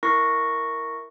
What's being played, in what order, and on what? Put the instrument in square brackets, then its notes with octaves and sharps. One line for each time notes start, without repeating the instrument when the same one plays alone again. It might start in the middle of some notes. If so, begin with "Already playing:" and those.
[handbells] E4 A#4 C#6 A#6